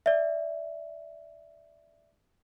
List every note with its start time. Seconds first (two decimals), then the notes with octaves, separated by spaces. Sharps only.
0.06 D5 E5